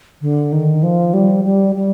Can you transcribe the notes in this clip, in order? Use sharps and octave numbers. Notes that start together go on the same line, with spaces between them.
D3
D#3
F3
G3
G3
G3